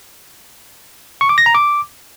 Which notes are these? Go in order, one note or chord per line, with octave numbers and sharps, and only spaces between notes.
C#6
D6
A#6
A#5
D6